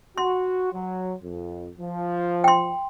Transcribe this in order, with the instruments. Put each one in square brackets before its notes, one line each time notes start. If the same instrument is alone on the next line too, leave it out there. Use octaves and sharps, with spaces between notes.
[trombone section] F#4 [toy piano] C6
[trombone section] F#3
F2
F3
[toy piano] G5 C6